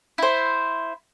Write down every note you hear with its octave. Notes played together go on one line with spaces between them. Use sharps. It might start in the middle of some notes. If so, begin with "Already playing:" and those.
E4 C5